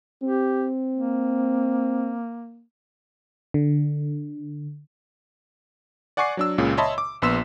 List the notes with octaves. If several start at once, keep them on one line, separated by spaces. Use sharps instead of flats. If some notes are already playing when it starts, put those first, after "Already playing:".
C4 G4
A#3
D3
D5 F#5 G#5 C#6 D6 C7
F#3 D4 E6
C#2 A#2 C#3
C#5 D#5 E5 A5 B5 C6
D6
A#1 B3 C6 E6 B6 E7